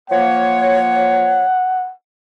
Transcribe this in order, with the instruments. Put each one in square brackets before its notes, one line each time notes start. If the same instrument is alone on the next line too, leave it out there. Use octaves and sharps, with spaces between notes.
[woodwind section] F3 A#3 C#5 [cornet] F#5